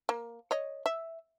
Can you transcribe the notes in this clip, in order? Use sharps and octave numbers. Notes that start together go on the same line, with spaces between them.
A#3
C#5 D#5
E5